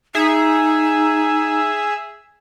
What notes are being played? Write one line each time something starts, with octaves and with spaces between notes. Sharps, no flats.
D#4 G#4 E5